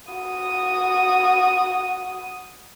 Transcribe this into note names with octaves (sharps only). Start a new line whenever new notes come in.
F#4 D#6